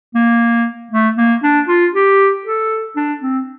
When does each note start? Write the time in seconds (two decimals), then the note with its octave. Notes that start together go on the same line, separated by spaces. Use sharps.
0.15 A#3
0.91 A3
1.17 A#3
1.43 D4
1.68 F4
1.94 G4
2.45 A4
2.96 D4
3.22 C4